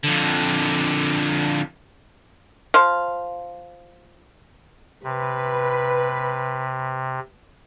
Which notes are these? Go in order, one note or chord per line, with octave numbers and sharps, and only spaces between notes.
F2 D3
F3 C5 F5
C3 B4